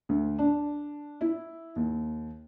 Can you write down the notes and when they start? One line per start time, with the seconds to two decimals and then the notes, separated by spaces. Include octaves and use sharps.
0.09 D2
0.39 D4
1.21 E4
1.76 D#2